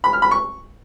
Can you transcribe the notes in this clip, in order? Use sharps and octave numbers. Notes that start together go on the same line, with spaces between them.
B5
F6
B5
C#6